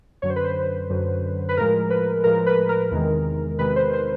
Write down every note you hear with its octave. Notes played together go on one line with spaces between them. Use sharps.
F#2 D3 F#3 C#5
C5
B4
C5
F#2 D3 F#3
B4
A2 F3 G#3 A#4
B4
A2 F3 G#3 A#4
B4
A#4
E2 C3 D#3 G#3
E2 C3 D#3 G#3 B4
C5
C5